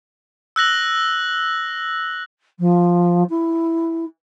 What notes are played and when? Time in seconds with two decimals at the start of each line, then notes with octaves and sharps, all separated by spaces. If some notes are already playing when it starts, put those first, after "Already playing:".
0.56 E6 F#6 A#6 F#7
2.59 F3
3.29 E4